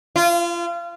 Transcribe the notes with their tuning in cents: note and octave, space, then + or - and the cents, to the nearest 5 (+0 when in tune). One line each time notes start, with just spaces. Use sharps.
F4 -30